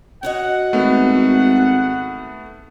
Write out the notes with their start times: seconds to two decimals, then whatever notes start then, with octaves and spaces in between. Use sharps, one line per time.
0.23 C#4 F#4 D#5 F#5
0.73 G#1 A3 B3